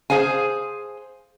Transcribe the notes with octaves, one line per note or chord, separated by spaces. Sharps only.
G#4 C5 F5 G#5